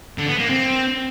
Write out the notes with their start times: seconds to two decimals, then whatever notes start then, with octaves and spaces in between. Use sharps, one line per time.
0.18 D3
0.29 B3
0.40 A#3
0.50 C4